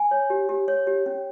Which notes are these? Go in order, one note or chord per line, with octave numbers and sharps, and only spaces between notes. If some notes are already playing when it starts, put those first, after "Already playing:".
Already playing: G#5
C#5
G4
G4
C#5
G4
C#4